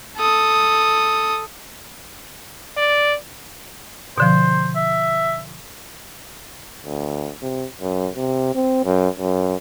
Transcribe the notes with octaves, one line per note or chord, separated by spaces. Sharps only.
A4 D#6
D5
B2 D3 F3 C5
E5
D2
C3
F#2
C3
C4
F#2
F#2